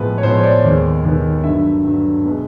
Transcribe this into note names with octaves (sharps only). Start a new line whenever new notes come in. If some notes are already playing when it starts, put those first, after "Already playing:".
Already playing: A2 F3 G#3 B3 B4
C#5
A2 F3 G#3 B3 C5
C#5
D5
D#2 D#3 G#3 B3
D#2 D#3 G#3 B3
G2 D3 F#3 E5
G2 D3 F#3
B2 G#3 B3